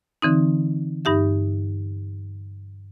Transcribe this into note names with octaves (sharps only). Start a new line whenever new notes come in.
D3 E3 C4 D#4
G2 D#4 G4 E5